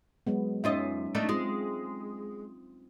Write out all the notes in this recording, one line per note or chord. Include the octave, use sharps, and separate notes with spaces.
F#3 G#3 B3
F#2 C#4 D#4 F4 D#5 E5
A3 D4 D#4
G#3 C4 F4